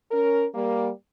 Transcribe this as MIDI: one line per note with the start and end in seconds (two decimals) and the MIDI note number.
0.12 0.46 61
0.12 0.46 70
0.54 0.90 55
0.54 0.90 58